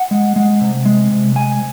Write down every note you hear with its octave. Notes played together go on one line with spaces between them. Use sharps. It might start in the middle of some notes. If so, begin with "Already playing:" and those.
Already playing: F#5
G#3
G#3
C3
G#3
C3
G#3 G#5